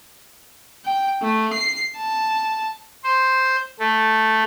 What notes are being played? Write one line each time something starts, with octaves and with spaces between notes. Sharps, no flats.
G5
A3
C7
A5
C5
A3